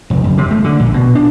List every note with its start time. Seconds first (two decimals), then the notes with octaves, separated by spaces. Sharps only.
0.10 F1
0.24 F#1
0.38 C3
0.51 A3
0.64 D3
0.80 A#1
0.94 B2
1.15 D4